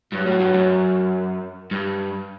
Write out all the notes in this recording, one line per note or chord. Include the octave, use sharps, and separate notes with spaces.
G2 F#3
A2
G2
F#2
G2